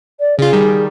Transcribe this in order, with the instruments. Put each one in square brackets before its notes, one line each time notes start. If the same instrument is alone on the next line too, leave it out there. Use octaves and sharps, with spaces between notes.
[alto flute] D5
[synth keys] C#3 F4 [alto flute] G#4
[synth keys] D#3 G3